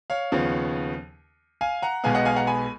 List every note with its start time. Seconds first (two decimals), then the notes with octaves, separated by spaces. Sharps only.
0.10 C#5 F5
0.32 D#2 C#3 F3 B3
1.61 F5 G#5
1.82 F#5 A#5
2.04 B1 B2 G#3 B3 F5 G#5
2.15 D#5 F#5
2.25 F5 G#5
2.36 F#5 A#5
2.47 G#5 B5